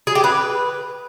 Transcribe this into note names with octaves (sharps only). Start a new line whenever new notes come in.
G#4
G4
B4